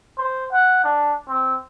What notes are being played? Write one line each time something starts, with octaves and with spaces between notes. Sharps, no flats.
C5
F#5
D4
C4